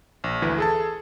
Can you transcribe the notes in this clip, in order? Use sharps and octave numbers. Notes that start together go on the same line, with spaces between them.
A#1
D2 E3 B4
G#4 A4 A5